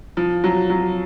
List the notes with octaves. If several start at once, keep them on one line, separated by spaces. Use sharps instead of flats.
F3
F#3
F#3